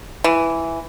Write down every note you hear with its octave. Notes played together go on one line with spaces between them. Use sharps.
E3